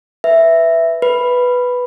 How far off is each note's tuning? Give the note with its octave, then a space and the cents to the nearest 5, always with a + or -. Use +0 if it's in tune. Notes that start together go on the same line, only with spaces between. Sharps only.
B4 +5 E5 +0
B4 +0 B5 +0